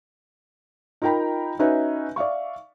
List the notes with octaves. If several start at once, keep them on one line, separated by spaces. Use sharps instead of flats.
D#4 F4 A#4 G5 A#5 B5
C#4 D#4 F#4 B4 E5
D5 E5 F5 C#6